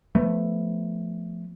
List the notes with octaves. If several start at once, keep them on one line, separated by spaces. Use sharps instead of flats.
F3 A3 B3